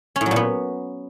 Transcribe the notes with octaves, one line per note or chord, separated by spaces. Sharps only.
C#4
A2
F#3
A#2
B3